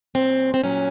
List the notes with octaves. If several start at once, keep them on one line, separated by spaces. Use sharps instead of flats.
A#2 F#3 C4
C4
A#2 F#3 C#4